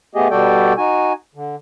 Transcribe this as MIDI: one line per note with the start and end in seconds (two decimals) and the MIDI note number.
0.15 0.28 57
0.15 0.28 59
0.15 0.28 67
0.15 0.28 68
0.15 0.28 75
0.31 0.73 47
0.31 0.73 55
0.31 0.73 66
0.31 0.73 69
0.31 0.73 74
0.31 0.73 79
0.78 1.13 63
0.78 1.13 66
0.78 1.13 80
1.35 1.56 50